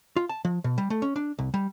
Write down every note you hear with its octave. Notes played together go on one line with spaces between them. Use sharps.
F4
A5
F3
B2
G3
A3
C#4
D4
C2
G3